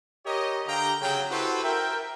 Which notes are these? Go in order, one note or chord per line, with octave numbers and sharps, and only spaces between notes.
G4 A#4 C#5 D#5
D3 G4 F5 G5 A#5
C#3 F#3 G5
E4 F#4 G4 A4 B4 C5
A#4 E5 G5